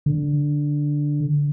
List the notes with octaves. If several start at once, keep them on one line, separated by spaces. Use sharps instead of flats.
D3